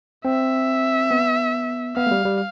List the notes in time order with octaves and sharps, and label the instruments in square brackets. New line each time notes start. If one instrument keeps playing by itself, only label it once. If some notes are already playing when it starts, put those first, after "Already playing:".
[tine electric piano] C4 [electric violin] E5
[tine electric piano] B3
[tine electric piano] B3 [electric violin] F5
[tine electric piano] A3
G3
G3